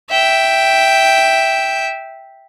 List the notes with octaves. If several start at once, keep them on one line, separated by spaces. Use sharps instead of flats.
E5 G5